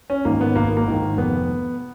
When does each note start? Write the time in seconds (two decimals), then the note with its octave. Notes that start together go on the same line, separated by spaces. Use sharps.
0.10 C#4
0.25 G#2 D#3 A#3
0.41 B3
0.56 G#1 A#3
0.77 A#3
0.88 G#2 D#3
1.17 F1 B3